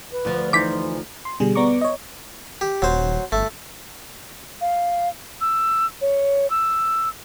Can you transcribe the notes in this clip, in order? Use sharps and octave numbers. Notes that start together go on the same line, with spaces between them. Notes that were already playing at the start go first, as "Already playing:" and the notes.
B4
D2 F3
E3 D#4 C5 D6 B6
C6
B2 D3 G3 G#4
B3 D5 A#5 C#6 D6
C#5 D#5
G4
D#1 F#3 C5
G1 A3
F5
E6
C#5
E6